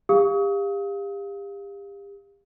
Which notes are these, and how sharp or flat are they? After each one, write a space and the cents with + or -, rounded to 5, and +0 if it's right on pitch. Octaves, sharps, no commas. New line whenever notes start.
G4 +35 F5 +5 D#6 +40